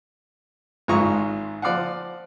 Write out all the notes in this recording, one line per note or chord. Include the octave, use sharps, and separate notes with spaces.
G#1 G#2 F4 A#5 C#6 D#6
F3 D5 F5 F#5